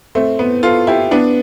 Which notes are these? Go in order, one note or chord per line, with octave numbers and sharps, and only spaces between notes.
A3 C4
B3
F4 A4
E4 G4
B3 D4